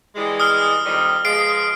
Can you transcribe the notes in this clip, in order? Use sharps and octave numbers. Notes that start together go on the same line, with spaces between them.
E3 G3 G#3
D#6 F6 G7
F2 D#3 G3
B2 F3 G#3 C7 D7